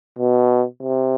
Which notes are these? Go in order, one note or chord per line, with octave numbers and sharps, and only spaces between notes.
B2
C3